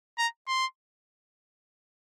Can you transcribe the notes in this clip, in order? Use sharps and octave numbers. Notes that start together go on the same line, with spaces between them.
A#5
C6